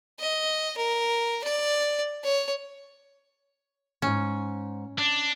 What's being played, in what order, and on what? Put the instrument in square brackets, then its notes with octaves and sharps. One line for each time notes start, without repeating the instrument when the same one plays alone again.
[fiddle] D#5
A#4
D5
C#5
[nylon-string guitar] D2 G#2 [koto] C#4
[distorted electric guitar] D4